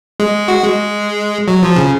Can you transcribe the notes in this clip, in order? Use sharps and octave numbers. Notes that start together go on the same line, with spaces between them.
G#3
F#4
G#3
F#3
F3
C#3